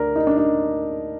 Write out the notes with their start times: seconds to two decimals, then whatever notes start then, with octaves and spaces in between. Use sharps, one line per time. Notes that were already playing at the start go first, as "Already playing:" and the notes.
Already playing: D2 D3 A#4 D5
0.16 D#4
0.27 D4
0.38 D#4